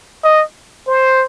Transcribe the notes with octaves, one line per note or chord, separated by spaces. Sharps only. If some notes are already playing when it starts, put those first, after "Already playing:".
D#5
C5